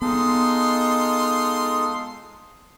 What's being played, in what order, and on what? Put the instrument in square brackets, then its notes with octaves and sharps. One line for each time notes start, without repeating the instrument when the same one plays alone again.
[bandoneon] G#3 D#4 A4 [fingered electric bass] B3 [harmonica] F4 C6 D#6